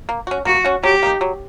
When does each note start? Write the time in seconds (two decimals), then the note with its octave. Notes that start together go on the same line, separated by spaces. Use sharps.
0.09 A#3
0.27 C#4 F#4
0.45 A#3 F#4
0.64 C#4 F#4
0.83 F#3 G4
1.03 A#3 D#4
1.21 F#3